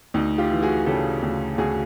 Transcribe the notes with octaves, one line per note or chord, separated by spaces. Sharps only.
D2 D#4
F4 G4
E3
F#4 G#4
C#3 G4 A4
D2
D2 F#4 G#4